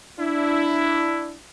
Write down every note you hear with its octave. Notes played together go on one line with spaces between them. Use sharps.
D4 E4